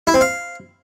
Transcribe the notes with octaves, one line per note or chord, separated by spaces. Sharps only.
E4
C4
F5